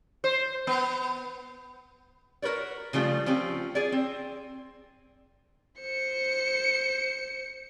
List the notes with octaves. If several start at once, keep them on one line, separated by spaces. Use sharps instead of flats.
C5
B3
F#4 A#4 B4 C#5 D5
C#3 F3 G3 A3 F4
F3 C4 C#4 G4
G#4 D5
C4
C5 C#7